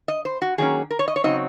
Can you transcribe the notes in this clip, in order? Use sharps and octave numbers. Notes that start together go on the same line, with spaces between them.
D#5
C5
F#4
D#3 F#3 A#3 C#4 G#4
A#4
C#5
D#5
C#5
C#3 F#3 C4 D#4 D#5